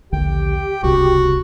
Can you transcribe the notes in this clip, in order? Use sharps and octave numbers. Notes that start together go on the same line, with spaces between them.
A#1 D#2 D3 G4 G5
D1 C2 C#3 F#4